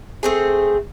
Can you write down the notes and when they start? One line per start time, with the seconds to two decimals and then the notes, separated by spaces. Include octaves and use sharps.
0.23 A3 C4 G#4